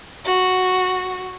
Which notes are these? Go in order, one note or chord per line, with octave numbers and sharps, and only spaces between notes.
F#4